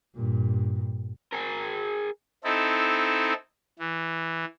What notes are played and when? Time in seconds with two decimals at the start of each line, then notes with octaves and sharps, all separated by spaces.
0.15 G2 A#2
1.33 G#4 A#4
2.44 C4 D#4 E4 A4
3.79 E3